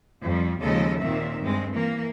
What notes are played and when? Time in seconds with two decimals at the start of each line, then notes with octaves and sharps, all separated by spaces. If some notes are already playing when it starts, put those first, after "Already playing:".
0.22 F2 F3 G3
0.60 D#2 C#3 F3 G#3 A4 D#5
1.00 D#2 A#2 D#3 A#3 C4 E5
1.40 G2 G#3 C4
1.72 E3 A#3